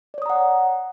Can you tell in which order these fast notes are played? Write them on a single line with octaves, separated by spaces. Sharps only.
D5 C#5 D#6 A#5 F#5